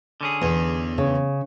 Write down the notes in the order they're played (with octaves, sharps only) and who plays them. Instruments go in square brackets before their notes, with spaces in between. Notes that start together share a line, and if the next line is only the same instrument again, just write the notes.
[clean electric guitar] D3 C#4 G#4
[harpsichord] E2
[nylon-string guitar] C#3